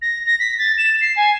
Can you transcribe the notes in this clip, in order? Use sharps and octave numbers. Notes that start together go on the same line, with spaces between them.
A#6
A#6
B6
A6
E7
C7
G#5